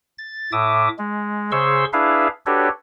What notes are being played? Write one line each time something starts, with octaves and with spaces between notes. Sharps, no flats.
A6
A2 E5 D6 D#6
G#3
C#3 G#4 C5 C6 C#6 E6
D4 E4 G#4 B4 E5 F5
D4 F#4 G4 A4 B4 C#5